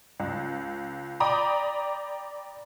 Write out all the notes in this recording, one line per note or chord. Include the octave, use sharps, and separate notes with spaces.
C#2
D5 G5 A#5 B5 D6 D#6